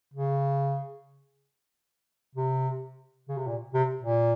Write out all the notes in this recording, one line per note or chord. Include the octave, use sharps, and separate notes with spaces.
C#3
C3
C#3
C3
A#2
C3
A#2